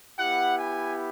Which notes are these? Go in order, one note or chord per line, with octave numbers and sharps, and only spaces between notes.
B3 E4 G4 F#5
G#5